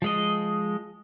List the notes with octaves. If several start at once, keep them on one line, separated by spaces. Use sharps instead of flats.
F3 G#3 D#5